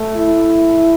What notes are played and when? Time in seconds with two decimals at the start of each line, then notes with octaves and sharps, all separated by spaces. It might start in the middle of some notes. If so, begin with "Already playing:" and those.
Already playing: A3
0.16 E4